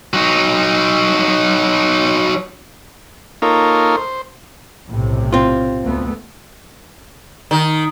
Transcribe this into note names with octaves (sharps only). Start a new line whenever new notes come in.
F#3 D#4
A#3 D#4 F4 A4 A#4 C#5
C5
B1 A2 C3
C4 F4
D2 A3 B3
D#3